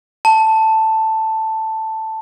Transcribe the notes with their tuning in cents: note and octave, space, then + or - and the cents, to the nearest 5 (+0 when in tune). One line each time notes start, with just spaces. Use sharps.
A5 +5